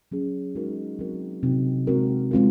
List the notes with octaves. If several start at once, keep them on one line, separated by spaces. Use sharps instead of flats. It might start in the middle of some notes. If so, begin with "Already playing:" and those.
F#3 C#4 G#4
G#3 D#4 F#4 A#4
F#3 C4 F#4 A#4
C3 F#3 C4 D#4 F#4
G#3 C4 F#4 A#4
G#3 C4 F4 A#4